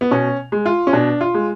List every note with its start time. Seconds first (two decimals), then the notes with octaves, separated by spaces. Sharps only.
0.01 B3
0.11 B2 C#4
0.52 G#3
0.66 F4
0.87 C#4
0.93 B2 D4
1.21 F4
1.34 G#3